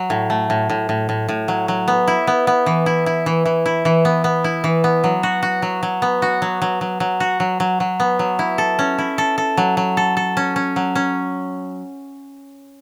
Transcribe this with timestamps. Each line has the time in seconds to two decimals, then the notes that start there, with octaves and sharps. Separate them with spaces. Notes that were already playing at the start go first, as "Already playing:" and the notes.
Already playing: F#3
0.10 A2
0.30 A3
0.50 A2
0.70 A2
0.89 A2
1.09 A2
1.28 A2
1.48 F#3
1.68 F#3
1.88 B3
2.07 E4
2.27 B3
2.47 B3
2.66 E3
2.86 E4
3.06 E4
3.26 E3
3.45 E3
3.66 E4
3.85 E3
4.05 B3
4.24 B3
4.44 E4
4.64 E3
4.84 B3
5.04 F#3
5.23 F#4
5.43 F#4
5.62 F#3
5.83 F#3
6.02 B3
6.22 F#4
6.42 F#3
6.62 F#3
6.81 F#3
7.00 F#3
7.20 F#4
7.40 F#3
7.60 F#3
7.80 F#3
8.00 B3
8.19 F#3
8.39 E4
8.58 A4
8.79 C#4
8.98 E4
9.18 A4
9.38 A4
9.57 F#3
9.77 F#3
9.97 A4
10.17 A4
10.37 C#4
10.56 C#4
10.76 F#3
10.95 C#4